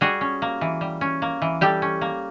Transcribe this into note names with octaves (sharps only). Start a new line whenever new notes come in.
G3 F#4 G#4
C#4
A#3
E3
G3
C#4
A#3
E3
G3 G4 A4
C#4
A#3